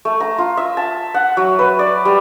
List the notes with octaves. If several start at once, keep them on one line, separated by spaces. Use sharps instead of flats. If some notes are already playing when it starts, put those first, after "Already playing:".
A3
A#5
F4
E5
A5
F#5
F#3
B4
D5
G3